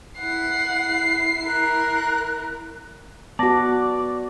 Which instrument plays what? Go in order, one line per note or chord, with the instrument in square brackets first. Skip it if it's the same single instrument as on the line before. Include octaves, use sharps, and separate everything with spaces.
[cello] E4 [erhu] F#5 [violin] C7
[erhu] A#4 [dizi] F#6
[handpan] B3 F#4 [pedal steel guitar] D5 [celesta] A5 A#6